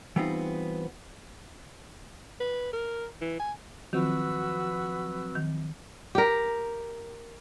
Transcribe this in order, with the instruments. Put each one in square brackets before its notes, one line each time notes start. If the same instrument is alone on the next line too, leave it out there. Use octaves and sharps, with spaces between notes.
[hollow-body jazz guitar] E3 G3 B3 C4 D#4 F4
[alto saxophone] B4
A#4
E3
G#5
[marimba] D#3 [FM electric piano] F3 F#3 C4 [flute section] F#4 B4 E6
[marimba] D#3
[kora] G4 A#4